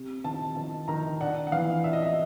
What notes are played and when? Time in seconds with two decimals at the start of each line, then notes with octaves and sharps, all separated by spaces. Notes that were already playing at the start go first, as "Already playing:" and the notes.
Already playing: C3
0.24 D#3 A5
0.56 D#3 A5
0.88 D#3 A#5
1.20 D4 F#5
1.47 F#5
1.52 E3 F5
1.84 D4 E5
1.93 D#5
2.02 E5